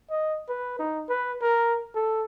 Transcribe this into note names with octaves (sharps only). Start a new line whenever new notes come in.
D#5
B4
D#4
B4
A#4
A4